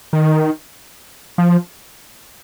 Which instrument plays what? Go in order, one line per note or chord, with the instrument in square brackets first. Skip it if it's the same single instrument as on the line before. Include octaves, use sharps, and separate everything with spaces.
[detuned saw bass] D#3
F3